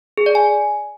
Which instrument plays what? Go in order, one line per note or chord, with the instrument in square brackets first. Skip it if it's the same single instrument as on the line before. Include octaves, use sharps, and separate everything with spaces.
[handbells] G#4
D5
G#5